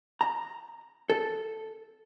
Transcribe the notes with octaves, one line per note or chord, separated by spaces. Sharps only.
A#5
A4